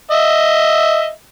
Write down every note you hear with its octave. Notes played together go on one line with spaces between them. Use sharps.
D#5 E5